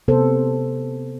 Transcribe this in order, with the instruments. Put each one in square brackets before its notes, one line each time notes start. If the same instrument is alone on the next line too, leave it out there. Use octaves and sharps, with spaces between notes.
[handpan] C3 B3 A4 C5